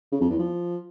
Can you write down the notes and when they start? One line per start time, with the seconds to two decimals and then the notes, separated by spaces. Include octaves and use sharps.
0.12 C#3
0.21 F2
0.30 E2
0.39 F3